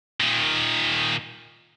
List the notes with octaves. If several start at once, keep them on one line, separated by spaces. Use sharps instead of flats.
A#2 D#3